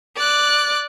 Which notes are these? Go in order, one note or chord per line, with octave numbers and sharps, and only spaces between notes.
D5 F#6